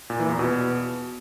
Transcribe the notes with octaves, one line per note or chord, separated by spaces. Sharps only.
A#2
E3
E2
B2